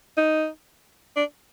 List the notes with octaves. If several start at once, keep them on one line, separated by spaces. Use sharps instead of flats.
D#4
D4